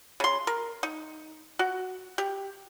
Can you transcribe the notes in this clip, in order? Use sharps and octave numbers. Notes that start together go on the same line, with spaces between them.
C#3 C6
A#4
D#4
F#4
G4